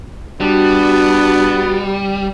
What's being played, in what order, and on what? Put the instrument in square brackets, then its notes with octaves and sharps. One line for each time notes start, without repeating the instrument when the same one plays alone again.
[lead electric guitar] G3 [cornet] B3 [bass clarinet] D4 [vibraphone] F#4